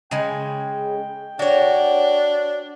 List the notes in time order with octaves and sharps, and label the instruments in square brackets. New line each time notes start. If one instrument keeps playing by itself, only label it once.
[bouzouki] C#3 G#3 [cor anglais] G5
[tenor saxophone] D4 [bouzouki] F#4 C#5